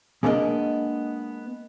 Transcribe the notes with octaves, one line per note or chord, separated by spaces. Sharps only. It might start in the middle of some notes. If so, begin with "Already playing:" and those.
G#3 A#3 B3 D4 A#4 D#5